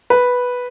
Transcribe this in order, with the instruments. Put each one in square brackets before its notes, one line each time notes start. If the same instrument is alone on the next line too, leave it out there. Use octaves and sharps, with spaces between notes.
[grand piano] B4